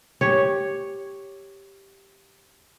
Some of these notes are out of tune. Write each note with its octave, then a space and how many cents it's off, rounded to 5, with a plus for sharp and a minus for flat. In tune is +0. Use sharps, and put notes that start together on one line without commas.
G4 +0 C#5 +0